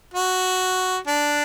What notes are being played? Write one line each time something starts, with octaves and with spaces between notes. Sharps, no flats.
F#4
D4